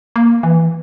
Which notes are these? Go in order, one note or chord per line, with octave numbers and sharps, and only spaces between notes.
A#3
E3